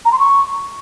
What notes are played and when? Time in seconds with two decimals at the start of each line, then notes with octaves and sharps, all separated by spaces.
0.05 A#5
0.12 C6
0.19 C#6